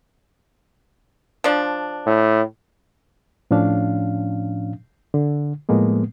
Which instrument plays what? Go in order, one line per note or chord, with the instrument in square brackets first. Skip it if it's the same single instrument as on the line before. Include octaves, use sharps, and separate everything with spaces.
[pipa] F3 D4
[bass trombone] A2
[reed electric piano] A2 F3 C#4 D4 F5
D3
A2 F3 G#3 A#3 B3